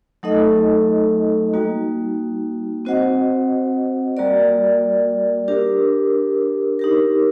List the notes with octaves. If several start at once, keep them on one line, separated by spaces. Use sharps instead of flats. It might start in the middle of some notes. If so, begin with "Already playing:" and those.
F#3 A3 D#4 A4 D#5
G3 A#3 D#4 F#4
C4 F#4 C5 D#5 F#5
G3 A#3 F#4 A#4 D5
D4 G4 A#4
D#4 G4 A#4